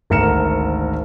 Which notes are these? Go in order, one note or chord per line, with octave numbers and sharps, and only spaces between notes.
G#1 D2 A#4 C#7 E7